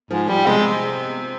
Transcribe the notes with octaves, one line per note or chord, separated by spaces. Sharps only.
G#2 F3
F3 G3
C3 G#3